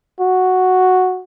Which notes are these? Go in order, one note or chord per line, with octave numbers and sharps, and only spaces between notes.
F#4